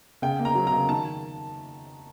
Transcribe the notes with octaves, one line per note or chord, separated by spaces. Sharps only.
C#3 G5
A#3
A#5
F#3
A#5
C#3
D#3 A5